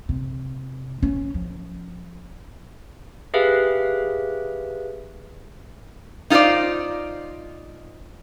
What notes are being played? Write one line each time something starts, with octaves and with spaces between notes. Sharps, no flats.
C3
C#4
F3
G4 G#4 B4 E5 F5
D#4 F4 G#4 C5 D5